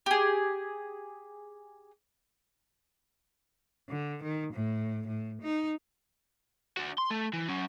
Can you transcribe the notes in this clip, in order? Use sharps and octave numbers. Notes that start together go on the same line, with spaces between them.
G4 G#4
D3
D#3
A2
A2
D#4
D4 F#4
C6
A3
E3
F#3 C#4